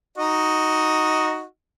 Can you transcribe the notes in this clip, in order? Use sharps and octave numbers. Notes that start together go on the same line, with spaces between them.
D#4 F#4 D#5